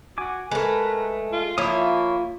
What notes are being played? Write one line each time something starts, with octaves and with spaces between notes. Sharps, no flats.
F#4 G#5 D6
G#3 A3 A#4 B4
F4
F3 A#3 E4 F4 C#5 E5 D#6